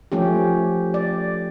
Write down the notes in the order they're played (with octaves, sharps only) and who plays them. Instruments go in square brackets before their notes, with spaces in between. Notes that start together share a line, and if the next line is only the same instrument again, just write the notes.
[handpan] F3 A3 C#4 G4
D5